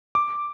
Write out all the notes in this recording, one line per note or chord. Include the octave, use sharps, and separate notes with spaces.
D6